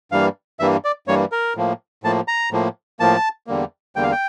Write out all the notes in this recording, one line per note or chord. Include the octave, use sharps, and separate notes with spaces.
G2 E3 G3 A#3 F5
G2 E3 G3 A#3 E5
D5
G2 E3 G3 A#3 C#5
A#4
A2 F3 A#3
A2 F3 A#3 A5
A#5
A2 F3 A#3
A2 F3 A#3 A5
E2 D3 G3 A#3
E2 D3 G3 A#3 G5
F5
G5